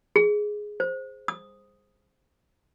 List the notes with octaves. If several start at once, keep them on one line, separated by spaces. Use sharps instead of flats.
G#4
C5
D#6